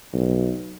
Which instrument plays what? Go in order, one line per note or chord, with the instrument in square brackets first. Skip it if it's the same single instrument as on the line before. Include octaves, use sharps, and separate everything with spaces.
[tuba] B1